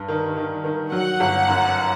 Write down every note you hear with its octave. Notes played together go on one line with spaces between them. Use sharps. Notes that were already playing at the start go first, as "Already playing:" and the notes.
Already playing: G2
D#3
D#3
D#3
F#3 F#5
G1
F#2